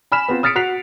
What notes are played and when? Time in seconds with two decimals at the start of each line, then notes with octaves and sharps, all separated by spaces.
0.12 G#5 B5 F6 B6 E7
0.29 B3 C4 F4
0.43 D#6 F6 A6 B6 C#7 D7
0.55 F#4 F#6 B6 C7 F7